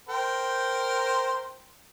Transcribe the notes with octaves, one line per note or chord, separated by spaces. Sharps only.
A#4 C5 G5